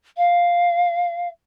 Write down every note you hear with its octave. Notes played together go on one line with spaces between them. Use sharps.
F5